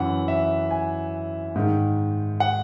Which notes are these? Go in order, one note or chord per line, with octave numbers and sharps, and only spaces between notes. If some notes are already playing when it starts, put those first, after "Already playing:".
Already playing: F#2 E3 F#5
E5
G#5
G#2 D#3
F#5